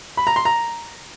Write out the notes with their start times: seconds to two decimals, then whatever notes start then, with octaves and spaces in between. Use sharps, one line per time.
0.17 B5
0.27 A#5
0.36 C6
0.45 A#5